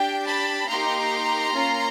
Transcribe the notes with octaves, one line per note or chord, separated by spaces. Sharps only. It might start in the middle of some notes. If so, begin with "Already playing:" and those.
Already playing: D4 G4 G5
A5 B5
A#3 D#4 G4 A#5 C6
A#3 C#4 F4